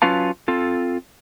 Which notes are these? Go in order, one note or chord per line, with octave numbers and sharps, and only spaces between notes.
F#3 C#4 F4 B4 F5 A5
C4 F4 A4